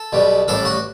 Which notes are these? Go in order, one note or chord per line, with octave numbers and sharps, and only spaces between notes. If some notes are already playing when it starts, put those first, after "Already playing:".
Already playing: A4
B1 B2 G3
A1 A2 G3 A4
F#4